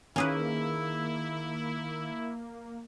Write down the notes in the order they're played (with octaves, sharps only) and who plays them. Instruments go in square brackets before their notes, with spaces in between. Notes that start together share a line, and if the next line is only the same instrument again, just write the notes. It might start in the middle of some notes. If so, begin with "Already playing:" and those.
[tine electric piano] D#3 [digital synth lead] A#3 [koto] C#4 G#4 B4 [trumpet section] E4